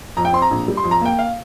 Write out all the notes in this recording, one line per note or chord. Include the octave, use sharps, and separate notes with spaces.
F2 A#5
G5
C4 C6
A#5
A#1
G3
C6
F2
A#5
A#3 G5
F5